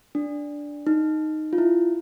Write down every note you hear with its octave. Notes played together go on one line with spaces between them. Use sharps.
D4
D#4
F4
E4